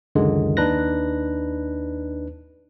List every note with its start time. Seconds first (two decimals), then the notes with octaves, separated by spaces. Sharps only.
0.15 C#2 F#2 D3 D#3 G#3
0.57 D#2 D4 D#4 B4 F#6 A#6